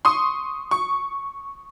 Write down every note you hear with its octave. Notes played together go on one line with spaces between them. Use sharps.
C6 C#6 D#6
C#6